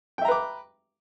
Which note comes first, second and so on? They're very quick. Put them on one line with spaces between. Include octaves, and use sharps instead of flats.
G5 E5 A#5 B4 D6